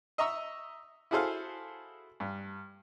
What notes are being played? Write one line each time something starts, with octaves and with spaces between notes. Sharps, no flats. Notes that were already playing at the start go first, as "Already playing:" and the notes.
D#5 E5 A#5 C#6 E6
E4 F#4 G#4 A4 C5 F5
G2